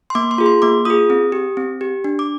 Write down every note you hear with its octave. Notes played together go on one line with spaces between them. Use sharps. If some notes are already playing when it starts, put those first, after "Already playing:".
C6
A#3 D6
C6
F4 G#4
C6
A#3 D6
F4 G#4 D#6
C4
G4
C4
G4
D4
D6